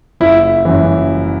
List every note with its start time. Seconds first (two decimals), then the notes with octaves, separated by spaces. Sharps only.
0.20 F#1 E4
0.65 F#2 E3